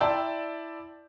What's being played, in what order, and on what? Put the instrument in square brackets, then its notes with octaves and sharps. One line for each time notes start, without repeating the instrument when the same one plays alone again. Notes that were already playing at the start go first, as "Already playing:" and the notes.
[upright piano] E4 D5 G5 A5 C6 E6